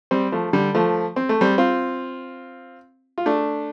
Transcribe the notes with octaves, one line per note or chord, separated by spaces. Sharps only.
G3 C4
F3 A3
D3 G3
F3 A3
C4
A3
G3 C4
C4 F4
F4
A3 D4